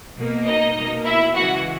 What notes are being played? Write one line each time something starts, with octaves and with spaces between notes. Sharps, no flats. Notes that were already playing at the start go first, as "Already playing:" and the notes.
B2 A#3
D#4 D#5
B2 A#3
E4 E5
C#3 E3 G#3 F#4 F#5